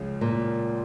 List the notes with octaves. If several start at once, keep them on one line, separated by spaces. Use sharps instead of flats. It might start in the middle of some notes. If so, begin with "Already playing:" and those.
Already playing: C#2 C#3 F3
A#2